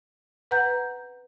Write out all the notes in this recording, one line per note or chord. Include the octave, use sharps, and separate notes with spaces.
B4 F#5 A#5 G6